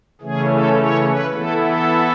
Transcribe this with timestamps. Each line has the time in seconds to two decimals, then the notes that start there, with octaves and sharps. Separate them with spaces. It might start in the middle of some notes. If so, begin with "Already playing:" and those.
0.21 C#3 E3 A3 C#4 G#4
0.49 A4
0.77 C#5
1.06 B4
1.34 E3 B3 E4 A4
1.62 A4